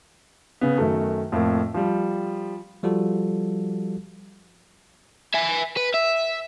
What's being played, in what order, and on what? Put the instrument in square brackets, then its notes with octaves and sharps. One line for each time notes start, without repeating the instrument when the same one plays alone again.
[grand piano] C#3 B3
F#2 D#3 A3
F2 A2 A#3
F3 G3
[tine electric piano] F3 G3 F4 F#4 A4
[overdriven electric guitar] E5 G#5
B4
E5